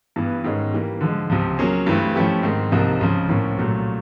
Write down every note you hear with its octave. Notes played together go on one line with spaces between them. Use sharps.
G2 E3 G3 B3
G#2 D#3 G#3 C#4
E3 G3 A#3
D3 F3 G#3
C#2 C3 F3
F#3 A#3 C#4 F4 G#4
G2 E3 A3 C4 E4
F3 A3 C#4 E4 G4
G#2 D#3 G#3 C4
C2 C3 F3 A#3 D#4
C#2 C#3 F3
A2 F3 A#3 C#4
C2 A#2 F#3 A3